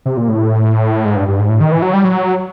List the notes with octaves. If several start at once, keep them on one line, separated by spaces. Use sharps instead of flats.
C3
A#2
A2
G#2
G2
G2
G#2
A2
D#3
E3
F#3
G3
F#3